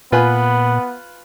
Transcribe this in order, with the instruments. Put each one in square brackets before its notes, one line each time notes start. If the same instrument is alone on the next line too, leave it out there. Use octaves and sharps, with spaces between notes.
[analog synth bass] A#2 [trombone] B3 [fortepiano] F4 B4 G#5